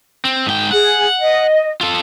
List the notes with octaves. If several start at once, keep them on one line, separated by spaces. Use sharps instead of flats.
C4
G#2 G5
G#4 F#5
D#5
F4 A4